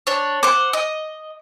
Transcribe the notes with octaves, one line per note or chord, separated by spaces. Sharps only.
D4 C#5
C5 F#5 D6
D#5